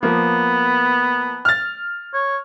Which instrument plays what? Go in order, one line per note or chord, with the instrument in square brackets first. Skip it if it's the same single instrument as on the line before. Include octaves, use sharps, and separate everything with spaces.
[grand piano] F3 A#3 [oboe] B3
[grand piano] F6 A6
[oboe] C#5